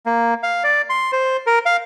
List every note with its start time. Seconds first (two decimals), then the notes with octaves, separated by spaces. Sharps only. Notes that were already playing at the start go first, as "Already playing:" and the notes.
0.06 A#3
0.43 F5
0.64 D5
0.90 C6
1.12 C5
1.47 A#4
1.66 F5